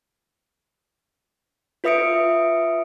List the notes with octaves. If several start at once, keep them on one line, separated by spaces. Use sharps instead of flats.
F4 B4 E5 D#6 C#7 D7